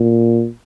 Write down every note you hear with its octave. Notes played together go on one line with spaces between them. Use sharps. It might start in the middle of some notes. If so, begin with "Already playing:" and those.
Already playing: A#2